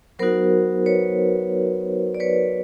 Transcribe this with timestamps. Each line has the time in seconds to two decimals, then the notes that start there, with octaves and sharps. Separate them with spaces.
0.19 F#3 B3 D#4 F#4 A#4 C5
0.86 B4 C#5
2.15 D5
2.20 B4 C#5